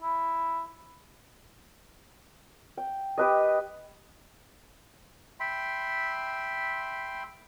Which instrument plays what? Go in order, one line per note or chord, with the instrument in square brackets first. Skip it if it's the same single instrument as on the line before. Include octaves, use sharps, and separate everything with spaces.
[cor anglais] E4
[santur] G5
G4 B4 D#5
[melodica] E5 G5 B5 C6